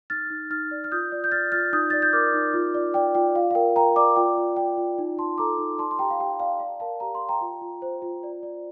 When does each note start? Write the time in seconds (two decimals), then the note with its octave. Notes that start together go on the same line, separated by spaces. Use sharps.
0.10 D#4 F6 A6
0.30 D#4
0.50 D#4 F6 A6
0.71 D5
0.84 F6
0.92 F4 D#6 G6
1.12 D5
1.24 G6
1.32 D5 F6 A6
1.52 F4 F6 A6
1.73 D#4 D#6 G6
1.90 D5 A6
2.02 G6
2.13 A#4 D6 F6
2.34 D#4
2.54 F4
2.74 D5
2.94 D5 G5
3.15 F4 G5
3.35 F4 F5
3.51 F5
3.55 A#4 G5
3.76 A#4 G5 A#5
3.96 D5 A#5 D6
4.16 F4 G5
4.37 F4
4.57 D5 G5
4.77 F4
4.98 D#4
5.17 D#4 A5 C6
5.38 A4 A#5 D6
5.59 D#4
5.78 D5 A5 C6
5.91 C6
5.99 G4 G5 A#5
6.10 F5
6.20 G4 G5
6.39 D5 F5
6.60 D5 F5
6.80 A#4 F5 A5
7.00 G4 A#5
7.15 C6
7.21 A#4
7.29 G5 A#5
7.41 F4
7.62 F4
7.82 C5
8.02 F4
8.23 D5
8.43 D5